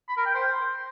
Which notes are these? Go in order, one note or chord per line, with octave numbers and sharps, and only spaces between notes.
B5
A#4
G5
C5